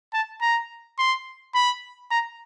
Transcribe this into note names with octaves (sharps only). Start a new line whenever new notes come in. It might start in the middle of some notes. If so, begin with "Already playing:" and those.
A5
A#5
C6
B5
A#5